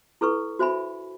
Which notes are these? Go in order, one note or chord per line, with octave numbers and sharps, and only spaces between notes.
E4 A4 B4 C#6
F#4 C5 E5 G#5 B5